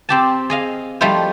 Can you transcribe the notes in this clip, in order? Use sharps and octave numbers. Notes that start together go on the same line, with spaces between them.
C4 G4 A5
G#4 D#5 F5
F3 G3 A3 D#4 E4 C5